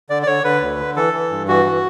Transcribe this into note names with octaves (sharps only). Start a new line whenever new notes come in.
D3 D5
D5
D3 C#5
D3 B4
D2
D3
E3 A4
E3
G2
E3 F#4
E3